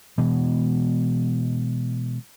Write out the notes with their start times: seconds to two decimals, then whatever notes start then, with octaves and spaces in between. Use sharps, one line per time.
0.18 B2 E3 G#3